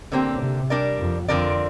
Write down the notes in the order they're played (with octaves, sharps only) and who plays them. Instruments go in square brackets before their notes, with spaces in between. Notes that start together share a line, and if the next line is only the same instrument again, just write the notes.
[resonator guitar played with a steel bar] D3 A#3 G4 [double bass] C4
[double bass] C3
[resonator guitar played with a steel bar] G3 D4 A#4 D5
[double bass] F2
[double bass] F2 [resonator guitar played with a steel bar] D3 F3 C4 A#4 D5